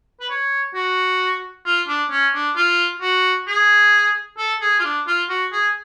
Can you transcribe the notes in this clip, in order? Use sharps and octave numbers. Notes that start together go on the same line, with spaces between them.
B4
C#5
F#4
F4
D4
C#4
D4
F4
F#4
G#4
A4
G#4
F4
D4
F4
F#4
G#4